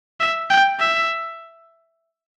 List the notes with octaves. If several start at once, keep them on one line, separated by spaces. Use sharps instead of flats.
E5
G5
E5